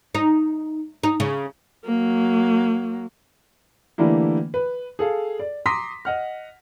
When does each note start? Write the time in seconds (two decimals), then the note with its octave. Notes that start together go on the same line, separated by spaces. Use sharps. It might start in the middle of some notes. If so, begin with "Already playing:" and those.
0.15 D#4
1.03 D#4
1.20 C#3
1.85 F#3 A#3
3.98 D3 E3 G3 A3 A#3 E4
4.54 B4
4.99 G#4 A4 F5
5.39 D5
5.66 A#5 C6 D6 D#6 A#6 B6
6.05 D#5 F#5 F6